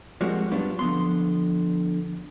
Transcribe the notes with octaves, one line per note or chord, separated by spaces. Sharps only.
F3 G3 G#3 A#3 C4 F#4
G2 F#3 B3 D4 F4
D3 F3 B3 C6